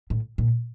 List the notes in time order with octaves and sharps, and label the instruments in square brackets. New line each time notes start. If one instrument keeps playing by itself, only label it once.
[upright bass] A2
A#2